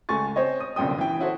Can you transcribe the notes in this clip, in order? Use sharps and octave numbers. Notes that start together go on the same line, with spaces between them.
C#2 A3 G#5 C#6 A6
C4 C5 C#5 D#5
D#6
G1 C2 F#2 A#2 G5 D#6
E3 E4 G5
C#4 E4 F#4 A4 C5